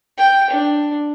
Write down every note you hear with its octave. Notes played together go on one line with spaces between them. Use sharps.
G5
D4